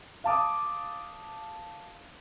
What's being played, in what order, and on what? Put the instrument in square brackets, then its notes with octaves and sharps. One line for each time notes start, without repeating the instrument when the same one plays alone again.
[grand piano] F5 A5 D6 D#6